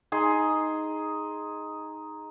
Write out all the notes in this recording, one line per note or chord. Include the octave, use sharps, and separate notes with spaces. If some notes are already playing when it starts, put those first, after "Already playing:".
D#4 G#4 C6